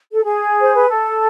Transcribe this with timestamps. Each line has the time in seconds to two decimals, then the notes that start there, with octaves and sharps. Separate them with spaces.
0.12 A4
0.24 G#4
0.60 C5
0.74 B4
0.88 A4